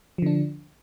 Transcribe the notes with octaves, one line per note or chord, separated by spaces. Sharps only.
D3 F3 D4